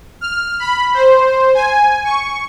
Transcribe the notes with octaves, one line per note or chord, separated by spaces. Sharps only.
F6
B5
C5
G#5
C#6